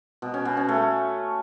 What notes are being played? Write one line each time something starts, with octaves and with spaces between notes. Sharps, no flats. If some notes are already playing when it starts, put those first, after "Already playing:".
B2
C#4
B2
C#4
A3